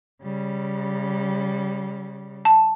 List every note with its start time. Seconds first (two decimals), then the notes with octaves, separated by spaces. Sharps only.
0.22 C#3 G3
2.45 A5